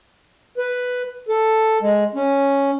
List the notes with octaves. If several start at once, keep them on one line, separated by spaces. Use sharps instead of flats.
B4
A4
G#3
C#4